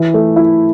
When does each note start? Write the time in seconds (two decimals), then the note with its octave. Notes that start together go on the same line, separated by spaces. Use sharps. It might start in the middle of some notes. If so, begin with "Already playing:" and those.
Already playing: E3
0.14 A3
0.36 E4